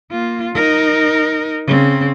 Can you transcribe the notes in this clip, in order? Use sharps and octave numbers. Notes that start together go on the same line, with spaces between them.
A#3 F4
D#4 A#4
C#3 C4